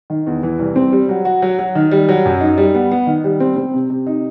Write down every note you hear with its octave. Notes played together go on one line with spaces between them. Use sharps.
D#3
E2
E3
C2
C4
G3
F#3
F#4
F#3
F#3
D#3
G3
F#3
F#2
D#4
G3
B3
B3
D#3
G3
C4
C4
C3
C3
D#4